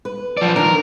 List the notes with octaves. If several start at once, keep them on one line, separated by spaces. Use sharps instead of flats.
B4
F3 D5
D#3 D4 A#4